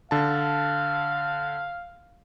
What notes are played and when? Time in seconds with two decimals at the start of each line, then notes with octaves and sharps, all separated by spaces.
0.11 D3 F5 A5